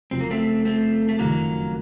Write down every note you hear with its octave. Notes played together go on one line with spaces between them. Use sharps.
F#1 F#2 F3 C4
A#3
A3 C4
A3 C4
A3
F#1 F2 D#3 F#3 A3 A#3